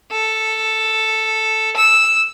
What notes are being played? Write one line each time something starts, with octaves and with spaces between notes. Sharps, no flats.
A4
E6